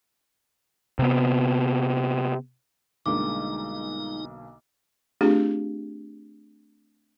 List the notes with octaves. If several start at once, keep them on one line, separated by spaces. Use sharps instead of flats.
C3 B3
B1 D3 G3 G#3 A#3 D#4 F4 D6
A3 C4 D4 F4 G4 G#4